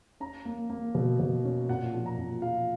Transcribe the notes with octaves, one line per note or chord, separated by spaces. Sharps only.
C#4 A#5
A#3
A#3
B2
B2
C#4
A#2 F#5
F3
A#5
A#2
F3 F5